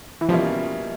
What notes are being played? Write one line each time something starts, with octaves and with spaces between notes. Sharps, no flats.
E3
B2 F3 G3 A#3 C#4 E4